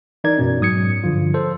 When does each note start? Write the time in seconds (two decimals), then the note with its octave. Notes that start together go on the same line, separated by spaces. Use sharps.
0.24 E3 D#4 A#4 D5 G#6
0.38 F#2 B2 C#4
0.60 G#2 F#3 D#6 G#6 C#7
1.04 G2 D3 F3 F4
1.34 A4 C5